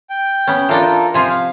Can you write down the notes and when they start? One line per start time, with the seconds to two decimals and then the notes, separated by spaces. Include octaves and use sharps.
0.10 G5
0.47 B3 C#4
0.69 E3 D4 F4 A4 A#4 G5
1.14 C3 F3 F4 C5 G#5
1.30 F5